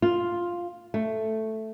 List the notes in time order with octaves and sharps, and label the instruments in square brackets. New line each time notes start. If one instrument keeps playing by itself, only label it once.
[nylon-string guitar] F4
A3